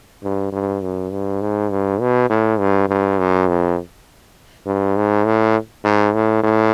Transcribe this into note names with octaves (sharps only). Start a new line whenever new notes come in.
G2
G2
F#2
G2
G#2
G2
B2
A2
G2
G2
F#2
F2
G2
G#2
A2
G#2
A2
A2